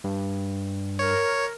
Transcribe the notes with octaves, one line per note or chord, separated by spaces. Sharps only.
G2
A#4 C#5